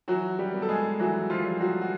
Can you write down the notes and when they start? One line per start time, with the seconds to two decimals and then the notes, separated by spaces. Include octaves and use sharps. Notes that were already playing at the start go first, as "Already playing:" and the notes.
0.08 E3 F#3 F#4
0.39 G3 G4
0.54 B3
0.62 A4
0.69 G#3 G#4
0.99 E3 F#3 F#4
1.30 F3 F4
1.45 G3
1.60 F#3 F#4
1.81 F#4